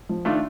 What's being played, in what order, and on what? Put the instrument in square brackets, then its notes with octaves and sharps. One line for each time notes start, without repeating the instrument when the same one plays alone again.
[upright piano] F3
[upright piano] D#3 [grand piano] A3 D4 F4